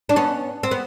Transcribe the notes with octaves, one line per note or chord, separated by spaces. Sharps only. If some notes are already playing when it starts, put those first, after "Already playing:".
D4
B3 C#4
C4
B3